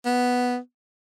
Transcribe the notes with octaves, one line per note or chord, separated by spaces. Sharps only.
B3